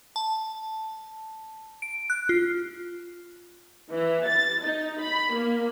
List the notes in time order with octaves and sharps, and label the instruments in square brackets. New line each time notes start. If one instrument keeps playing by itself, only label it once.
[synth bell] A5
D7
F#6
F4
[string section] E3
A6
D#4
B5
A#3